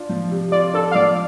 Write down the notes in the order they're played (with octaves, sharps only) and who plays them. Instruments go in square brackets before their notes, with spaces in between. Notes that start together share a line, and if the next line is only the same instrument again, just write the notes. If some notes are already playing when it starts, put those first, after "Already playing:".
Already playing: [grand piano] D4 F4
F3
C3
[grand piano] F4 [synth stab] D5
[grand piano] D4 [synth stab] A4
[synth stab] F5
[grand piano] F3 [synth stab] D5